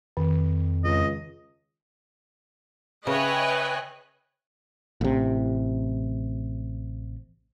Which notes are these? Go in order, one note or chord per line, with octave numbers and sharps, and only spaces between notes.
F2 D#3
C#2 D#5
C#3 B4 C#5 D#5 E5 G5 G#5 F#6
A1 C3